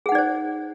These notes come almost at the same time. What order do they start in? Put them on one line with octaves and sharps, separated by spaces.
G#4 F#5 D#4 D5 C5